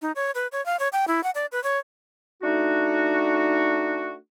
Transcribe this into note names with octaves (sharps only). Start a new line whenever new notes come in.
D#4
C#5
B4
C#5
F5
C#5
G5
E4
F#5
D5
B4
C#5
A3 D4 D#4 F#4